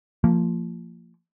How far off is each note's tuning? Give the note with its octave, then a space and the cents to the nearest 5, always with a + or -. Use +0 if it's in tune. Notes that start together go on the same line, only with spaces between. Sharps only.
F3 -10 A#3 -25